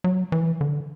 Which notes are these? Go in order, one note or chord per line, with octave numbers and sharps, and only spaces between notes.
F#3
E3
D3